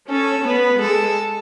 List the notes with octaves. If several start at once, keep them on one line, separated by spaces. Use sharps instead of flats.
C#4 A4
B3 B4
G#3 A4